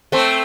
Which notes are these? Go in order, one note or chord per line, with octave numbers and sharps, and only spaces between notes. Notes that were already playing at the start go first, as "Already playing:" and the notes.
A3 C4